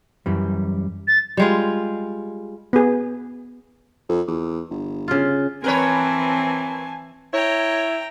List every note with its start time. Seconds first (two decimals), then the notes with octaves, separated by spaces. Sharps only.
0.26 F#2 E3 G3
1.08 A6
1.37 G3 G#3 F4
2.73 B3 G#4
4.09 F2
4.28 E2
4.71 G1
5.08 C#3 F4
5.64 E3 C4 A#4 B4 C#5 G#5 A5
7.34 E4 C#5 G5 A#5